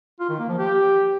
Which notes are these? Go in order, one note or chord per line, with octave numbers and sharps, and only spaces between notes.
F4
D#3
A#3
F3
G4